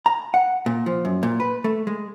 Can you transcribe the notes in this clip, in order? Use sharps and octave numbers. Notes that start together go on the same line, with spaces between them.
A#5
F#5
A#2
F3
F#2
A#2
B4
A3
G#3